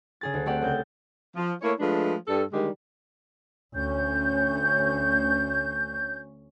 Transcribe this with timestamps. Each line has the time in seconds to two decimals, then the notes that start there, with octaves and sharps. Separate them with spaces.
0.21 C#3 G#4 A6
0.34 D2
0.46 A3 C4 G4 D5 F#5
0.61 C2 C#3 G6 A6
1.35 F3
1.62 A3 A#3 E4 C#5
1.79 F3 G#3 A3 D4 B4
2.28 G2 A4
2.53 D3 D#3 G3 G#3 G4
3.75 D2 C#4 G6